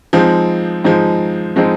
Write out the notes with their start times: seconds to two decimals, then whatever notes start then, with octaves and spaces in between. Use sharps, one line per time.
0.13 F3 G#3 C4 D#4
0.84 F3 G#3 C4 D#4
1.56 F3 G#3 C4 D#4